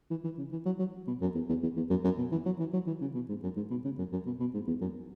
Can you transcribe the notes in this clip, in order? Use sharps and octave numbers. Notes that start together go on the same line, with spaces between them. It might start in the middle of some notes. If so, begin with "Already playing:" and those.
E3
E3
C#3
E3
F#3
F#3
B2
F#2
E2
E2
E2
E2
F#2
F#2
B2
E3
F#3
E3
F#3
E3
C#3
B2
G#2
F#2
G#2
B2
C#3
F#2
F#2
B2
B2
G#2
E2
F#2